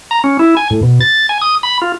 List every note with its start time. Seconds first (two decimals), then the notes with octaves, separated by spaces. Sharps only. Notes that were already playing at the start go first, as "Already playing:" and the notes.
0.11 A#5
0.24 C#4
0.39 E4
0.57 G#5
0.70 A2
0.83 B2
1.01 A6
1.29 G#5
1.41 D#6
1.63 B5
1.82 F4